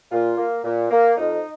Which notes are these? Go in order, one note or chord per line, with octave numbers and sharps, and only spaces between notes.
A#2 F4
A#3
A#2
A#3
F2 D#4